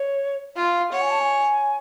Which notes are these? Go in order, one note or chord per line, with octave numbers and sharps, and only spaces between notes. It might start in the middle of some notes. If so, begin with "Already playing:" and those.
Already playing: C#5
F4 F5
C#5 F#5
G#5
A5
G#5